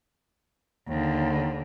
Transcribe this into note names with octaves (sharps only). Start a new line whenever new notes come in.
D#2 D3